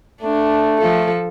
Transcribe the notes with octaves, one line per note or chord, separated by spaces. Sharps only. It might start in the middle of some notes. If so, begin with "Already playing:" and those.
A3 D4
F3 A4